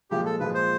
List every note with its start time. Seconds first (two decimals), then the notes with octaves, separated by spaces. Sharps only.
0.11 A#2 F3 G#3 G4
0.26 A4
0.40 A#2 F3 G#3 B4
0.54 C5